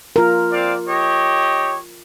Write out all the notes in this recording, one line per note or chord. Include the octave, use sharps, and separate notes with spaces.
F4 A#4
C4 D5 F5
G4 C#5 D#5